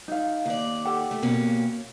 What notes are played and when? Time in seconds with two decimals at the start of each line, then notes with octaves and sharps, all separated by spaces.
0.08 D#4 F5
0.46 D#2 D5
0.85 G4 A4 F#5
1.11 A3
1.22 B2 A#3 C#4